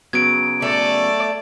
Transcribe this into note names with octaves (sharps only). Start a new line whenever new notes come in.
C#3 F#3 B3 G#6 D7
A3 D5